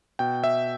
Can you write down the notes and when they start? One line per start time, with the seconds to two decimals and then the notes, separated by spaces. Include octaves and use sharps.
0.19 B2 G5
0.44 E5